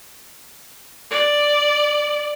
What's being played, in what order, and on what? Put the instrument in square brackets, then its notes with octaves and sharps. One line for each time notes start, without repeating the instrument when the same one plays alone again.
[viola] D5